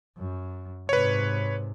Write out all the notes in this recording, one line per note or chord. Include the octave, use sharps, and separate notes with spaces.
F#2
G#2 C3 B4 C#5